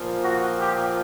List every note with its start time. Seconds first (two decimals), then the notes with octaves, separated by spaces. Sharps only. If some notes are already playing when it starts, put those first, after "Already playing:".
Already playing: A#2 F3
0.24 F#4
0.60 G4